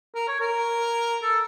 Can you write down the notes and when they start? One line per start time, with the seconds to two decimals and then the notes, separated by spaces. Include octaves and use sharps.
0.15 A#4
0.28 C#5
0.40 A#4
1.22 A4